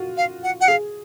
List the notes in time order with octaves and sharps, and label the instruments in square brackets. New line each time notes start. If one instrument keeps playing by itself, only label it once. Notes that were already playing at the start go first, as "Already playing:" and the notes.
Already playing: [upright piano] F4 F#4
[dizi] F5
F#5
F#5
[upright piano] G#4 [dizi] F5